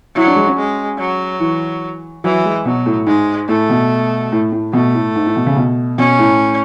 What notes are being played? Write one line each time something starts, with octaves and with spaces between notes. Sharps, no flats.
F#3 E4
D4
G#3
C#4
G#3
F#3
E3
E3 F#3
G#3
B2 F#3
A2
G#2 G#3
A2 A3
B2
A2
A2
B2 A3
A2
G#2
A2
B2
C#3
B2
B2 C#4
A2